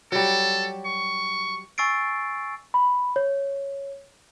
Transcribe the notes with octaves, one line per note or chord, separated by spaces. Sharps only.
F#3 G3 A4
C#6
G#5 C#6 E6 A6 C7 D7
B5
C#5